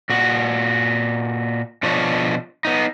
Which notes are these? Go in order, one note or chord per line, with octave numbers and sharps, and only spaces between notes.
A#2 F#4
B2 F3 D4 F4 C#5
B3 D#4